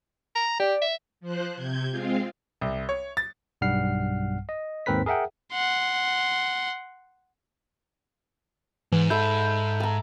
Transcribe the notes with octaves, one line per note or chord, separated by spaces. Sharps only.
A#5
G4 D5
E5
F3 C5 F#6
C3 G6 G#6
G#3 C4 F4 F5
C2
C#5
A6
B1 G2 G3 F#5 F6 C7
D#5
D#2 G#2 C4 A#4 B4 B6
G#4 A#4 E5 F#5 G5
F#5 C6
G#2 E3
A4 E5 B5 G6
A5 A#5